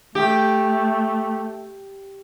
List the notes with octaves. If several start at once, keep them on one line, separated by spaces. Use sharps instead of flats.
A3 G4